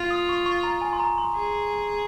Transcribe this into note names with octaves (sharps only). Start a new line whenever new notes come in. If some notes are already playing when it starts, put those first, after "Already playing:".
Already playing: F4
D#6
C#6
C#6
A#5
G#5
C6
A#5
C6
G#4